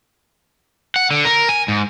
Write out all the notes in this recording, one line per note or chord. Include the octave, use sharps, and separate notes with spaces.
F#5
D3
A#4
G#5
G#2